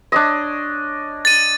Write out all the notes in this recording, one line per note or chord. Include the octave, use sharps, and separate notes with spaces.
D4 C#5 D#5
A6 D#7